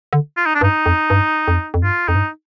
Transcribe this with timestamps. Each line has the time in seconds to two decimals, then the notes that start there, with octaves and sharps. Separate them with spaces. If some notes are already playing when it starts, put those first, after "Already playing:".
0.13 D3
0.37 F4
0.46 D#4
0.55 D4
0.61 G2
0.64 D#4
0.86 F2
1.10 G2
1.48 F2
1.74 F2
1.84 G2 F4
2.08 F2 D#4
2.15 G2